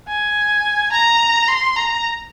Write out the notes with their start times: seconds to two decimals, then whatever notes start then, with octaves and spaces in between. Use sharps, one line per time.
0.08 G#5
0.92 A#5
1.48 C6
1.76 A#5